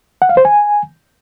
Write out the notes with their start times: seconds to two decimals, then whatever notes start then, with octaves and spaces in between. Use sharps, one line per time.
0.22 F#5
0.29 F5
0.37 C5
0.45 G#5